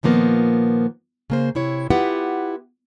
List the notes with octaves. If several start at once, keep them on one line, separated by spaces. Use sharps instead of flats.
A#2 D#3 F3 A#3 B3
C#3 A#3 C5
C3 E4 C#5
B3 E4 F4 G4 B4 F#5